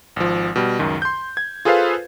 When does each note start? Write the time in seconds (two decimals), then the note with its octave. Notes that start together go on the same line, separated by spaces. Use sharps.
0.16 G#1 F3
0.56 B2 G3
0.79 C#2 F#2 D#3
1.02 C6 G6
1.37 G#6
1.65 F4 G#4 A4 B4 C5 F5